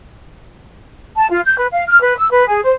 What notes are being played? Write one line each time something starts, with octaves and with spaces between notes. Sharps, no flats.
A5
F4
G6
B4
F5
F6
B4
E6
B4
G#4
C5